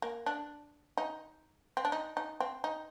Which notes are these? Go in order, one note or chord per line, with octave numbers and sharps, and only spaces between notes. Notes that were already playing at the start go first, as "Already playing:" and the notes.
A#3
D4
D#4
C4
D4
D#4
D#4
C4
D#4